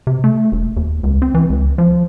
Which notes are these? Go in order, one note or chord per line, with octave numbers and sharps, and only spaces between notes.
C3
A3
E1
D#2
C#2
C4
E3
C#2
F3